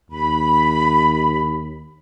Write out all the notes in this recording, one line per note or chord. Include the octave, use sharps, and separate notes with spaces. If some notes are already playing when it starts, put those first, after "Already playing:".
D#2 B5